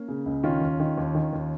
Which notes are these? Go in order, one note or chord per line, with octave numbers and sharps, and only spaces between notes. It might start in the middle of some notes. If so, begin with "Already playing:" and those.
Already playing: A#3 C#4
C#3
C#2
D#3 C#4 F4
D#2
D#3
D#2
D#3
D#2